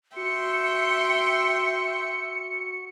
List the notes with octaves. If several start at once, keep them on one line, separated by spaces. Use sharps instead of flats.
F#4 E5 G5 C6 C#7